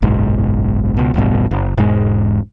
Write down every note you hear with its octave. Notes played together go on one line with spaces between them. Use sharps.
F#1 B1 G#2
C#2 B2
D1 A1 G2 B2
F#1
E1 G#2 G#3